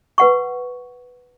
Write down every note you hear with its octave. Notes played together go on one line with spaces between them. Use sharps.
B4 F#5 C#6